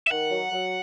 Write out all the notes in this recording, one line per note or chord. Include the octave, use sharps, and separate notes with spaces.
E5
D#3 F#5
F#3
F#3